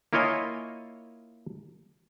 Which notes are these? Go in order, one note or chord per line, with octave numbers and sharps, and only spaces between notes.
A#3 E4 F4 C#5 D#5 G#5